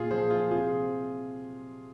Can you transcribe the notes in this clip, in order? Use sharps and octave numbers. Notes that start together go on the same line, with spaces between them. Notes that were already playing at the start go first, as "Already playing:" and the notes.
Already playing: A#2 F4 G#4
F3 G#4 C5
F4 G#4
C3 F4 G#4